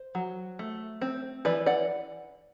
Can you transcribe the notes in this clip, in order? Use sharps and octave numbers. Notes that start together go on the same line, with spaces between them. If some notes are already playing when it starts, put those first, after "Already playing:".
Already playing: C5
F#3
A3
C4
E3 B4 D5
D5 F#5